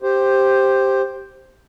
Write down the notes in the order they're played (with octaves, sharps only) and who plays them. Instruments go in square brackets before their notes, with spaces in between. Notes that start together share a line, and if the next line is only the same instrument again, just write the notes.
[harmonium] G4 C5